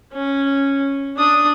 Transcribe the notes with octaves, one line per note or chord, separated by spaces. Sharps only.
C#4
D4 D#6